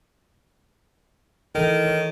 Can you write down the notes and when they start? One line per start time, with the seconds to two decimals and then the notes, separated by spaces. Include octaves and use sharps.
1.55 D#3 E3 A4
1.85 C#5